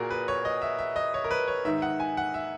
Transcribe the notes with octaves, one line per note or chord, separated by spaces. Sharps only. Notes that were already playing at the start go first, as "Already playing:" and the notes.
Already playing: A#2 F#4 G#4 A#4
B4
C#5
D#5
E5
E5
D#5
C#5
A#4
B4
C#5
G#2 D#3 E5
F#5
G#5
F#5
E5